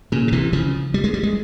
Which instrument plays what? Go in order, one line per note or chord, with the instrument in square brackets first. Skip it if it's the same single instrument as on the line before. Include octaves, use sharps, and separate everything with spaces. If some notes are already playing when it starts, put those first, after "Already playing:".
[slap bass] A#2 C#3
C#3
C3 E3
C#3 F3
G3
G#3
G3
G#3